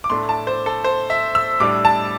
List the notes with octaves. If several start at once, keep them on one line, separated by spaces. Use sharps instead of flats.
D6
A2 A3 D4 C6
A5
C5
A4
C5
E5
E6
A2 G3 D4 D6
A5